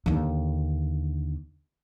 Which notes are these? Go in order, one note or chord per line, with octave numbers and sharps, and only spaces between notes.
D#2 D3